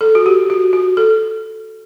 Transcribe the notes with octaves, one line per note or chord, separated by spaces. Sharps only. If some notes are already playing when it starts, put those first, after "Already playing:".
A4
F#4
G4
F#4
F#4
A4